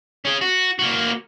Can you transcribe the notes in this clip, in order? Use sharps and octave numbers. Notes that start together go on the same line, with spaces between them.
C#4 G#4
F#4
A#3 F#4